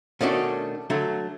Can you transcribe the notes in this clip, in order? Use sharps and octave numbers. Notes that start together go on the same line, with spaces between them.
B2 D#3 A3 C#4 D4 F#4
D3 F#3 A3